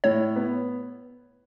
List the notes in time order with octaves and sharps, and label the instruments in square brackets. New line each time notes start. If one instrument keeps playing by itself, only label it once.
[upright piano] A2 [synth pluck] C#5
[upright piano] B3